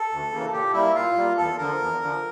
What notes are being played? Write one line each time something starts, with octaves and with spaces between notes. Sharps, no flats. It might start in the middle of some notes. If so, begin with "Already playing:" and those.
Already playing: A4
D2
C#3 E3 A#3
A#2 G4
G3 A#3 E4
A#2 F4
G3 A#3
E2 A4
D3 F3 A#4
E2
D3 F3